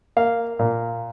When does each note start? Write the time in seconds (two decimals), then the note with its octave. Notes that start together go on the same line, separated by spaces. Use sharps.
0.17 A#3 F5
0.59 A#2